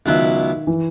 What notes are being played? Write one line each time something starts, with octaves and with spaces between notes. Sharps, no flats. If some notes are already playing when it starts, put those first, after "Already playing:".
C#2 B2 D#3 F#3 B3 E4
E3